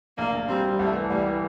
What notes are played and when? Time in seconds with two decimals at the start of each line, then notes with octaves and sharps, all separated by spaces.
0.18 A#1 A#3
0.34 A#1
0.49 G3 C4
0.64 G3
0.79 C2 A3
0.94 E3
1.10 C2 G3
1.26 E3